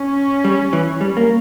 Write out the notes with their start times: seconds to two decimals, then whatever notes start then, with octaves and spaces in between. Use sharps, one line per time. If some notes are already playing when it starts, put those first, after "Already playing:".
Already playing: C#4
0.44 G3
0.73 E3
1.01 G3
1.17 A#3